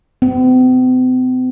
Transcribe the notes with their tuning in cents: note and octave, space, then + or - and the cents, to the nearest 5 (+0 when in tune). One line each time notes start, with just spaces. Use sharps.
C4 -45